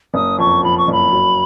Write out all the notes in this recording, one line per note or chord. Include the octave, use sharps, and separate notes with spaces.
F#1 D#6
F2 C#6
F3 B5
C#6
F#1 B5
F#3